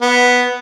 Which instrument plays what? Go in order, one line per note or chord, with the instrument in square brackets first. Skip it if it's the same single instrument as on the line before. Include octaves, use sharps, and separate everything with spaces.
[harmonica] B3